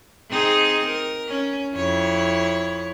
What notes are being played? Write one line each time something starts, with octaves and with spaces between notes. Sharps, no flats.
C4 D#4 G#4
A#4
C#4
F2 E4 C#5